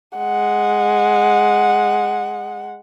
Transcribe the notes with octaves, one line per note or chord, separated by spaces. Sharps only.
G#3 F#5